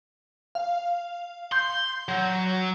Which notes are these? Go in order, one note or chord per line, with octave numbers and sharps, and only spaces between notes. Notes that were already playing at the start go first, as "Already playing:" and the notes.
F5
C6 G6
F#3